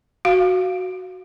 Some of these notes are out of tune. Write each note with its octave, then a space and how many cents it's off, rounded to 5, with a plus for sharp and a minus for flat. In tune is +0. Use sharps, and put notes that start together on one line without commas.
F#4 +0 F5 +0